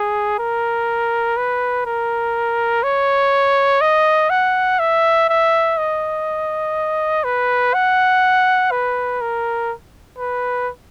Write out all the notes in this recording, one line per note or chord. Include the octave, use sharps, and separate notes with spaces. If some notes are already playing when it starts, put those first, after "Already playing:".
Already playing: G#4
A#4
B4
A#4
C#5
D#5
F#5
E5
E5
D#5
B4
F#5
B4
A#4
B4